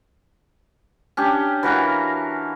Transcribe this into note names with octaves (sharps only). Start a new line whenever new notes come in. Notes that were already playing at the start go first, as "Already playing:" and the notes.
C#4 D4 G4
E3 F#4 A#4 F5